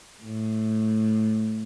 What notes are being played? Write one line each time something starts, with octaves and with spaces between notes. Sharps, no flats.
A2